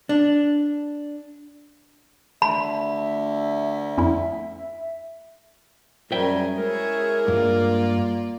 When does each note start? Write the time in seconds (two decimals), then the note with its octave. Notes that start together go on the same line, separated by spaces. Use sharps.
0.09 D4
2.42 D2 E5 B5
3.98 F2 C#4 E4
6.12 F#2 G3 C#4 G#4 A#4 C5 E5 G5
6.58 G#3 E4 G#4 A#4 C#5
7.28 G2 A#3 F4 D5